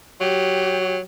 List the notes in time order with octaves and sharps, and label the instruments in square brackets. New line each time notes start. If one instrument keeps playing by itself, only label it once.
[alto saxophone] F#3 [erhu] G4